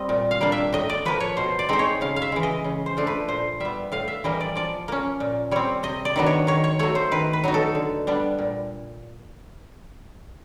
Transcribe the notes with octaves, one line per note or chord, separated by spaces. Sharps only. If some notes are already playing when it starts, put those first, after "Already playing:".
Already playing: G3 C4 D#5
A#2
F5
G3 A#3 D4
E5
A2 D#5
D5
F3 A#3 B4
C#5
B2 C5
D5
G#3 C4 D#4 C5
C#5
C#3 F5
F5
E5
E3 G#3
D#5
C#3
C5
F3 A3 D4
B4
A#2 C5
G3 B3 E5
A2 F5
E5
E3 G3 A#3 D#5
D5
F3 D5
A#3 C#4
A#2
G3 C4 C#5
C3 D#5
D5
D#3 F#3 B3 D4
C#5
D#3 C#5
C#5
F#3 A3 C#5
C5
D#3 B4
B4
F#3 B3 D#4
A4
D3
G3 B3 D4
A#2